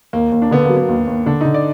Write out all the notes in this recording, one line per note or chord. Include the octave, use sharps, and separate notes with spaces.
D#2 A#3
D#2
D4
D3 B3
F#3 A#3
B3
D#2
D#2
D3 D4
D3 D#4
D5